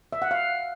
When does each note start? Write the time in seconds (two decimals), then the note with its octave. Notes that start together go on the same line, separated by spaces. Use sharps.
0.13 E5
0.22 F#5
0.31 F5